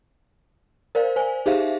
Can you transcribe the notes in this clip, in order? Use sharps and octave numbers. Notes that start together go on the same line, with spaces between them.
A#4 C5 D5 F5
C5 G#5
D#4 G4 G#4 C5 E5 F5